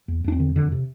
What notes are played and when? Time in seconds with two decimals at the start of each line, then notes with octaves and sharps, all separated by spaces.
0.08 E2
0.24 E2 D4
0.32 C4
0.40 D3
0.56 F2 D3
0.72 C3